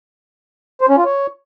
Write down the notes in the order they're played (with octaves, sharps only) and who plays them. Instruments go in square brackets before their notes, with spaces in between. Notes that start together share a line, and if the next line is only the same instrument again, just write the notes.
[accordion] C5
C#4
F4
C#5